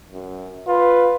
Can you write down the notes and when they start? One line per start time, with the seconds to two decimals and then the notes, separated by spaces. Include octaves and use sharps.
0.12 F#2
0.67 F4 B4